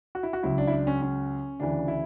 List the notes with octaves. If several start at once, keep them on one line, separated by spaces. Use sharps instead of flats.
F#4
E4
F#4
C#2 C#3 F#3 E4
D4
E4
D4
C#4
C#4
D2 C#3 E3 D4
E4